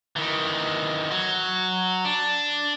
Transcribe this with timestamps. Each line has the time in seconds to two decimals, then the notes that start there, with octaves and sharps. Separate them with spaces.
0.16 D#3 E3
1.11 F#3
2.05 D4